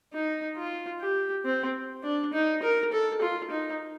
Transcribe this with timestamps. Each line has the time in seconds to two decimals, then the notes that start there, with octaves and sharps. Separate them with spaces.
0.13 D#4
0.57 F4
1.00 G4
1.45 C4
2.03 D4
2.33 D#4
2.63 A#4
2.92 A4
3.22 F4
3.51 D#4